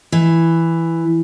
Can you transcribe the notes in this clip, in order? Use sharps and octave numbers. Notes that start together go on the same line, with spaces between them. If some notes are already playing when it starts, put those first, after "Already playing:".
E3